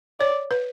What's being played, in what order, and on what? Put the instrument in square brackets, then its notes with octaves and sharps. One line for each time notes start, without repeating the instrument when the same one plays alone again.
[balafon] C#5 [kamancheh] D5
[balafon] B4